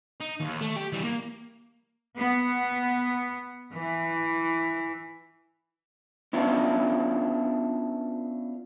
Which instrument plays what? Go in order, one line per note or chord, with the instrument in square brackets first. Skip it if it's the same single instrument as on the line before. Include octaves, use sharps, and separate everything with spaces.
[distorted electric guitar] D#4
D#2
A3
G4
E3 G3
A#3
[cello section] B3
E3
[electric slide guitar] B3 C#4 D4 E4 F4